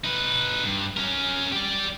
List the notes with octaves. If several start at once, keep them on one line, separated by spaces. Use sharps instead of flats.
D#4 B4
G2
C#4 A#4
G4 D5